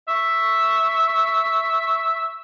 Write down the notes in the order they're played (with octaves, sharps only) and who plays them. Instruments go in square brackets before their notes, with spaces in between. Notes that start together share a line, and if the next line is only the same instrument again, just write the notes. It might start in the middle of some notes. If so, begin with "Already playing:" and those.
[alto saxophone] E5 [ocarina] C#6